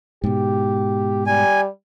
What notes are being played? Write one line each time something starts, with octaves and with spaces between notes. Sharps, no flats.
G#2 B2 G4
G3 G#5